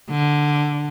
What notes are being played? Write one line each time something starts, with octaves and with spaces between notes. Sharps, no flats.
D3